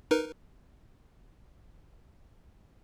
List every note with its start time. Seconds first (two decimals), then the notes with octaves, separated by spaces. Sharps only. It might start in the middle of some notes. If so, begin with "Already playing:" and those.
0.11 D#4 A#4 B4